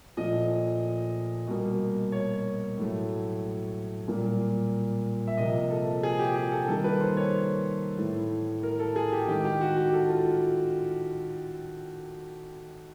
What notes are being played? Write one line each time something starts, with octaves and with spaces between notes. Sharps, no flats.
A#2 F3 A3 D#5
B2 G3 A#3
C#5
A2 F#3 A3
A#2 G3 A#3
E5
C3 F3 A#3 D#5
A4
G#4
G4
G#4
A4
D#3 G3 A#3 A4
B4
C5
C#5
A2 E3 A3
A#4
A4
G#4
G4
D#3 G#3 G4
G4
F#4
G4
A4
F4